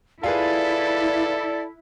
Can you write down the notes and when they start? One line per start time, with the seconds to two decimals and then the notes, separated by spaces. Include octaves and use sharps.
0.23 E4 F4 G#4 A4 B4 D5